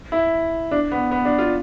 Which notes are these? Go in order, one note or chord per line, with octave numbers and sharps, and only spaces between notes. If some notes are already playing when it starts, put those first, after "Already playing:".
E4
D4
B3
B3
D4
F4